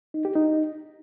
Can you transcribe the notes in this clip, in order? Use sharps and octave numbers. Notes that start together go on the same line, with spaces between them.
D#4
G4
D#4